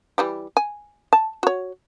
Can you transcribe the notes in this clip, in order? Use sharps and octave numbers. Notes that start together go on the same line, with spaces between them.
E3 G3 G4
G#5
A5
F#4 C#5